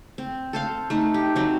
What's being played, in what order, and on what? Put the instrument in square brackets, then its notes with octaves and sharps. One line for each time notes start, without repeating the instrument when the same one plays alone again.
[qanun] C4
A4 C5 F5
A3 D#4
G4
F#3 C4